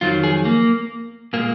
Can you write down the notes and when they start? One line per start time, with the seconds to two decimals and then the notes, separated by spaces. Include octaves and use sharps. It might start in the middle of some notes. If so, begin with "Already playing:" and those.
0.01 F2 D#3 F#3 F4
0.24 G#4
0.45 A#3
1.33 A#2 G#3 A#3